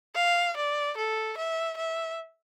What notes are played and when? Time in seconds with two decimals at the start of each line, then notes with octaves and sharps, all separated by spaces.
0.16 F5
0.57 D5
0.97 A4
1.37 E5
1.77 E5